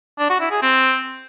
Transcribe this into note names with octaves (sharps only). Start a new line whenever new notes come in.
D4
F#4
E4
G#4
C4